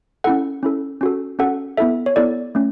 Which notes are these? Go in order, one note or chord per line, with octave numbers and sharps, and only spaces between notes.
C#4 E4 A4 F#5
C#4 E4 A4
C#4 F#4 A4
C#4 F#4 A4 F#5
B3 E4 A4 E5
C#5
B3 E4 A4 D5
A3 C#4